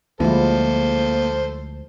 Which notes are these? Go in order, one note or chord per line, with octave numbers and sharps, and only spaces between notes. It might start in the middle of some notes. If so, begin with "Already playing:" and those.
D2 F3 G#3 A#3 E4 A4 C5